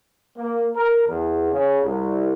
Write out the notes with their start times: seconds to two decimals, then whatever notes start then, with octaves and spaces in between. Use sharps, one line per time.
0.37 A#3
0.77 A#4
1.08 E2
1.52 C#3
1.83 C2